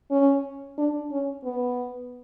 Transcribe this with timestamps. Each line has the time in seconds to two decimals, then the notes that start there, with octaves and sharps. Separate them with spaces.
0.11 C#4
0.78 D4
1.12 C#4
1.44 B3